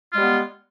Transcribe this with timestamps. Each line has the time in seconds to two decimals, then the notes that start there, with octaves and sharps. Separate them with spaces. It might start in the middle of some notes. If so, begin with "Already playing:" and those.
0.12 F4
0.15 G#3
0.18 G3
0.21 B3